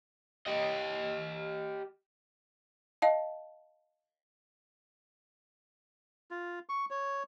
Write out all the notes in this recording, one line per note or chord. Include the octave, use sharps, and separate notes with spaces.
G4 D#5
D#5 F5 A5
F4
C#6
C#5